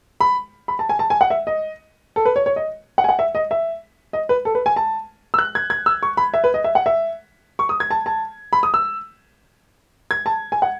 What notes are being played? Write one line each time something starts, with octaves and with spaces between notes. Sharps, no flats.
B5
B5
A5
G#5
A5
G#5
F#5
E5
D#5
A4
B4
C#5
C#5
D#5
F#5
G#5
F#5
E5
D#5
E5
D#5
B4
A4
B4
G#5
A5
E6
F#6
G#6
G#6
E6
C#6
B5
E5
B4
D#5
E5
F#5
E5
C#6
D#6
G#6
A5
A5
B5
D#6
E6
G#6
A5
G#5
F#5